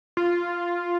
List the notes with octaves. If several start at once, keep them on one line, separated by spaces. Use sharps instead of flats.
F4